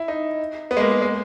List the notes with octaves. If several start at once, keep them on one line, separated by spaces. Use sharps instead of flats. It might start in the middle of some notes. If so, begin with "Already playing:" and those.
Already playing: E4
D#4
B3
G#3
A#3
G#3
G#3